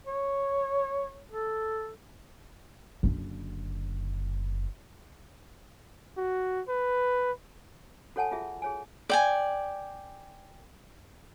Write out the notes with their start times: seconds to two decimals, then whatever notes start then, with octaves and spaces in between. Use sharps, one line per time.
0.07 C#5
1.31 A4
3.03 F#1 D3
6.17 F#4
6.68 B4
8.16 F#4 A4 C#5 F#5 G#5 A5
8.31 F4 F#4 G#4 E5
8.62 G#4 C#5 G#5
9.09 D5 G5 G#5